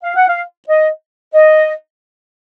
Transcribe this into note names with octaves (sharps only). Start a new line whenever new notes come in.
F5
F#5
F5
D#5
D#5